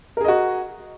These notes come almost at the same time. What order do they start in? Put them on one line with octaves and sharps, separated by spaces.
A#4 G#4 D#5 F#4